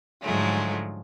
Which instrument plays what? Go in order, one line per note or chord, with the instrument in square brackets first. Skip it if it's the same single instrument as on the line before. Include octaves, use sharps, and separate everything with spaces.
[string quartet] G#2 D3 F3 F#3 G#3 A3